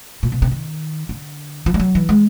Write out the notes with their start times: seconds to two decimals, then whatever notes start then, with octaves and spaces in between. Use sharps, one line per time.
0.23 A#2
0.32 B2
0.42 C3
0.51 D#3
1.09 D3
1.66 F3
1.74 G3
1.80 F#3
1.95 E3
2.09 G#3